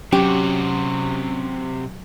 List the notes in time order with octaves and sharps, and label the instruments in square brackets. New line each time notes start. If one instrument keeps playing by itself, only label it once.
[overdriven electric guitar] C3 F#4 [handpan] F#3 [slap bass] C#4 [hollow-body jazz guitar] G4